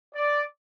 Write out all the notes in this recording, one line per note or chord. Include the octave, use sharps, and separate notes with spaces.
D5